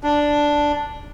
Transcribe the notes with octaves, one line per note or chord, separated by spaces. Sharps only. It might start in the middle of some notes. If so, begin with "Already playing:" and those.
D4